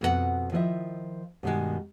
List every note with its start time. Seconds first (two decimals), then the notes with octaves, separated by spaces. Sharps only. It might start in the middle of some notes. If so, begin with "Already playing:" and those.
0.01 F2 B2 B3 F4 F#5
0.52 D#3 F3 E4 B4 D#5 E5
1.43 G2 B2 D#3 G3 G#3